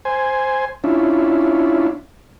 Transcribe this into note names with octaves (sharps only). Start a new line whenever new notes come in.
C5 G#5
C#4 D4 E4 F4